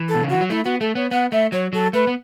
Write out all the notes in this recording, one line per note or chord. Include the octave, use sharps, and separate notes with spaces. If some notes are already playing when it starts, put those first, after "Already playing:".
Already playing: E3
A4
B2
C#3
E3 F#4
F#3
A3 E4
B3 F#4
A3 A4
B3 C#5
B3 F#5
A3 E5
F#3 C#5
F#3 A4
A3 B4
B3